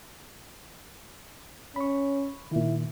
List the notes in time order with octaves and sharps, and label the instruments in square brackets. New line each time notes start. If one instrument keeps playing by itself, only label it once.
[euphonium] C#4 [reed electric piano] B5 C#6
[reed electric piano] A#2 D#3 [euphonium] E4